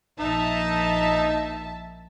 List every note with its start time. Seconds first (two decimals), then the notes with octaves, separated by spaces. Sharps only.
0.19 A#1 D#4 E5 A5